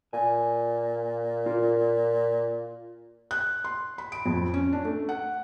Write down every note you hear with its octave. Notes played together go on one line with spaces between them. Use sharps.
A#2 G#5
F4 A#4
F#6
C6
B5
D7
F2
C#4
D4
A3
F#5